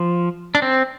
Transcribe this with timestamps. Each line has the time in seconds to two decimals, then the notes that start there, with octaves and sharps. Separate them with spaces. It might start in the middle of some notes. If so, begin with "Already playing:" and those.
Already playing: F3
0.55 D4
0.62 C4